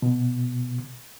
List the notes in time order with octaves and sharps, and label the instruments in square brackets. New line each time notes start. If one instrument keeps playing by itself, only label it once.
[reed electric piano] B2